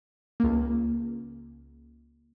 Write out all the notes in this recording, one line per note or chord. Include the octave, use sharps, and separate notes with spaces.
C#2 A#3